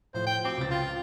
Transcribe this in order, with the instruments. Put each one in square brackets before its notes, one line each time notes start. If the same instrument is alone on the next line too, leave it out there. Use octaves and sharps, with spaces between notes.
[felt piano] A2 F3 [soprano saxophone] C5
[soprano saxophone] G5
[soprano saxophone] C4 [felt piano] F#4 G5 D6
[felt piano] C#2 A6
[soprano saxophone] F4